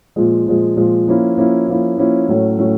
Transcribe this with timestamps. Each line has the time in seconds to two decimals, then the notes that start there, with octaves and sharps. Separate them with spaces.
0.16 A#2 F3 G#3
0.46 A#2 F3 G#3
0.77 A#2 F3 G#3
1.07 F3 A#3 C#4 E4
1.37 F3 A#3 C#4 E4
1.68 F3 A#3 C#4 E4
1.98 F3 A#3 C#4 E4
2.28 A2 F#3 A3 C#4
2.59 A2 F#3 A3 C#4